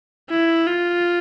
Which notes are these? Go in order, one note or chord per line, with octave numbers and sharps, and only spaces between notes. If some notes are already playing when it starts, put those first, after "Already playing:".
E4
F4